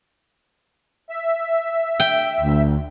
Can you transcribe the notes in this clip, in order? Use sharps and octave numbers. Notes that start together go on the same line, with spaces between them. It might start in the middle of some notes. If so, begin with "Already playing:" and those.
E5
G5
D2